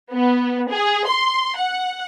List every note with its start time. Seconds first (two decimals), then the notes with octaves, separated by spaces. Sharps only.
0.12 B3
0.70 G#4
1.08 C6
1.57 F#5